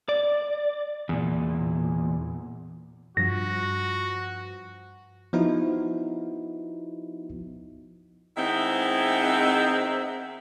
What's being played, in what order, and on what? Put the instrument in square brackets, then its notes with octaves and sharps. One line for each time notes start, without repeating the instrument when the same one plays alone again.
[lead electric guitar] D5
E2 A#2
[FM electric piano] G2 F3 [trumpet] F#4 [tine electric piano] A#6
[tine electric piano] F3 B3 D#4 E4 F#4
[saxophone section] D#3 G#3 B3 C4 E4